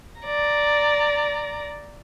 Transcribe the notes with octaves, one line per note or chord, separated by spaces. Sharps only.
D5 A#5